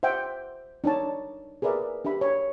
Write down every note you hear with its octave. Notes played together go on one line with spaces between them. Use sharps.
C5 E5 F#5 G5
D4 D#4 C#5 A5
G#4 A#4 B4 D5 E5
D4 G4 E5 B5
C#5